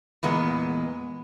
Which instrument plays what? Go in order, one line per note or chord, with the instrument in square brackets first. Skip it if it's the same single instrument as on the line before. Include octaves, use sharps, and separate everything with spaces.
[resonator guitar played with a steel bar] E2 A#2 G#3 B3